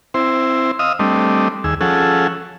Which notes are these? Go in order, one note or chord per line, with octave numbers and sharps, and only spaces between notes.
C4 E4 C5
D#5 F5 D#6 E6
G3 A3 C4 D4 D#5
D#2 G#4 E6
F3 C#4 G#4 A4 F#5 E6